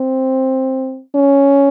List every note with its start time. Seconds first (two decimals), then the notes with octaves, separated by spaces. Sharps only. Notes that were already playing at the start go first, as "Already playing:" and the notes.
Already playing: C4
1.15 C#4